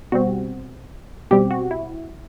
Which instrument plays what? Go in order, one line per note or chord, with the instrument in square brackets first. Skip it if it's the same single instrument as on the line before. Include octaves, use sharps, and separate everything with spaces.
[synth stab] B2 G3 C4 F#4
B2 G3 C4 G4
F#4
E4